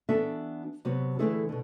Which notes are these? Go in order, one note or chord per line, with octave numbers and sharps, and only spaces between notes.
E3 B3 D4 F#4 A4 E5
C3 F#3 B3 F#4
D3 E3 A3 E4 G#4 A4
B2 D3